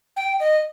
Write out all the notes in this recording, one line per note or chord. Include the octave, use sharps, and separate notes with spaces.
G5
D#5